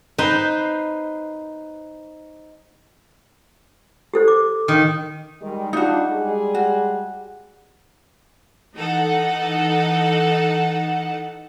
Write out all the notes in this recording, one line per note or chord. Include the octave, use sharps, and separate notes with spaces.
D#4 B4 C5
G4 A4 C5
D6
D#3
D#3 G3 G#3
G3 D4 D#4 F4 F#4
G3 G#3 G#4
F#4
E3 D#4 A4 F#5